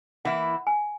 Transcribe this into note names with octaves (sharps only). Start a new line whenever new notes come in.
E3 A#3 E4 F#5
G#5